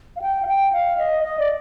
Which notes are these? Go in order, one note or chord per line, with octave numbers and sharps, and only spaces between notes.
F5
G5
F5
G5
F5
D#5
D#5
D5